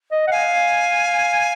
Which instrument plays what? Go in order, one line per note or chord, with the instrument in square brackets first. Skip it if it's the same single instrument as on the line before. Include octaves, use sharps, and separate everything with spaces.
[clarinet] D#5
F#5
[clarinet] F5 [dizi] G#5